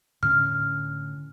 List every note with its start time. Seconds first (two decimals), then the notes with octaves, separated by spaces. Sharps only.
0.23 A2 D3 C#4 F6